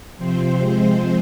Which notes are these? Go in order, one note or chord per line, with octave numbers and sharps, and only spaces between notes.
C3 F3 C4 C5
C3 F3 G#3 C4